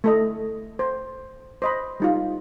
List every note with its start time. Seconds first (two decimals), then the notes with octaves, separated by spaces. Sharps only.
0.04 A3 A4 D#5
0.79 C5
1.62 C5 D#5 B5
2.00 G3 D#4 F4